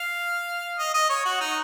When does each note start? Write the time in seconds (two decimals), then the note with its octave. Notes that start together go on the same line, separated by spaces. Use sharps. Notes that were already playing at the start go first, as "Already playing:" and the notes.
Already playing: F5
0.79 D#5
0.94 D#5
1.09 C#5
1.25 F#4
1.41 D#4